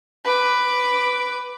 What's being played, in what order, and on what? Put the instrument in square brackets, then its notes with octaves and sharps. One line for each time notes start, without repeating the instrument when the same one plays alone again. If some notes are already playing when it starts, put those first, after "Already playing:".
[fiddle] B4 D6